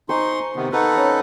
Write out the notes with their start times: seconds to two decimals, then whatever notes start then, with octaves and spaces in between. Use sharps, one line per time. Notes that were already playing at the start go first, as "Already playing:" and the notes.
0.09 D#4 C5 G#5 C6 C#6
0.56 C3 D#3 B3
0.72 D#4 A4 B4 F5 F#5 C#6
0.94 C#4 C5 A#5